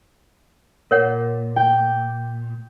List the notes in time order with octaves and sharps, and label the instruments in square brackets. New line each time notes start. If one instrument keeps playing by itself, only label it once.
[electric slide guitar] A#2 [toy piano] A#4 C#5 F#5
[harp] G5